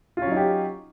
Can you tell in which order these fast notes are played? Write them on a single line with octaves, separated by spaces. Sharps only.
F4 C#4 F#3 D#4 G4